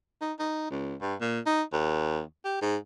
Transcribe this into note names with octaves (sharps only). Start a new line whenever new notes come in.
D#4
D#4
C#2
G2
A#2
D#4
D#2
G4
G#2